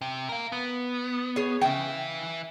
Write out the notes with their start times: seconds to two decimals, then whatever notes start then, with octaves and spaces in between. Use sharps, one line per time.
0.01 C3
0.29 A#4 F5
0.52 B3
1.36 G#4 C#5
1.61 C#3 E3 E5 G5